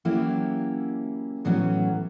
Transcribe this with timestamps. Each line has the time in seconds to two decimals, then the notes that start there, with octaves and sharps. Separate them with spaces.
0.05 E3 F#3 A#3 C#4 E4 G4
1.45 A2 E3 F#3 B3 C#4